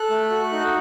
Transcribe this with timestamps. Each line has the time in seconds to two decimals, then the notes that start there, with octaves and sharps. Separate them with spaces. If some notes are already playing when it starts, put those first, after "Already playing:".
Already playing: A4 F#6
0.10 A3
0.30 F#4
0.52 D#4